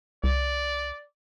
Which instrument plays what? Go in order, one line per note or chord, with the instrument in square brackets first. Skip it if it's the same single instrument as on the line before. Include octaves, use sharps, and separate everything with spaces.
[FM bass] C2 [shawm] D5